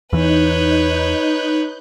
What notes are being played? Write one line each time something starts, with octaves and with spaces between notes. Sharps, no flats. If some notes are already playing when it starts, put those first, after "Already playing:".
E2 E3 D#4 B4 C#5 F#6 G6